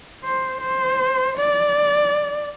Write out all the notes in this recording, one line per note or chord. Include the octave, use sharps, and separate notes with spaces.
C5
C5
D5